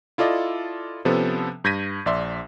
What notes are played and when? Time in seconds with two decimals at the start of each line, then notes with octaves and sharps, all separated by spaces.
0.18 E4 F4 A4 D5 D#5
1.05 C3 F3 B3 C#4 A4
1.64 G2 G6 G#6 A#6 B6 D#7
2.06 A#1 D5 E5 C6